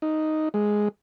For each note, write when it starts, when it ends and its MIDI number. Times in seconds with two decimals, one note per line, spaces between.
0.02 0.49 63
0.54 0.88 56